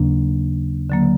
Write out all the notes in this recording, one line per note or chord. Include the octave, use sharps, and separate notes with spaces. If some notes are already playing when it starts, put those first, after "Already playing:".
Already playing: D#2 C#3 F#3 A#3 D4
D3 F#3 A#3